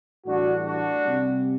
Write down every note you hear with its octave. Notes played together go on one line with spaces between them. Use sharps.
A2 E3 G3 D4 F#4
D4 F#4
C3 G3